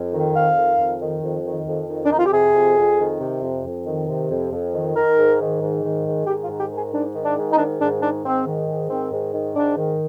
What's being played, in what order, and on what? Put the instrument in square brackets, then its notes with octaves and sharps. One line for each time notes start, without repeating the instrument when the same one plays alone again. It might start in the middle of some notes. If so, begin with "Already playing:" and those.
Already playing: [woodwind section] F2
D#3
F2 F5
D#3
F2
D#3
F2
D#3
F2
D#3
D4
F2 D#4
F4
G4
C3 G#4
F2
F2
D#3
C3
F2
F2
D#3
C3
F2
F2
D#3
D#3 A#4
G#2
D#3
G#2
D#3
G#2
D#3 G4
F4
G#2
G4
D#3
G#4
G#2 D4
D#3
D4
G#2
D#4
D#3 D4
G#2 D4
D#3 D4
G#2 C4
D#3
G#2
D#3 C4
G#2
D#3
G#2 D4
D#3